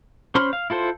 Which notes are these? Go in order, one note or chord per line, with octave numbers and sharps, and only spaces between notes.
C#4 C5 B5 C6 F6
F5
E4 F4 A4 C5